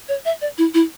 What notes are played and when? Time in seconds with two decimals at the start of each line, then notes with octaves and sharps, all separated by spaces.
0.09 C#5
0.25 E5
0.41 D5
0.58 E4
0.74 E4